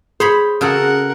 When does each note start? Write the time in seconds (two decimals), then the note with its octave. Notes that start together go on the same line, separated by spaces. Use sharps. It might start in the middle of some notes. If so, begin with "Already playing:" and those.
0.20 G#4 C5 C#5 B5
0.61 C#3 F#4 A4 A#4 F#5